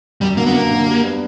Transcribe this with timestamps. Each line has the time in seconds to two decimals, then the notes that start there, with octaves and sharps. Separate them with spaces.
0.21 F#2 G3
0.37 D3 F#3 A#3
0.46 B3
0.54 F#2 A#3
0.71 D3 F#3
0.87 G3
1.04 B3 D4